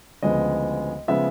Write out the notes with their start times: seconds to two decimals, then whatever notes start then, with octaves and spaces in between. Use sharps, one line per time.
0.23 D2 C#3 F3 G#3 B3 D#5
1.08 C#3 F3 G#3 B3 E5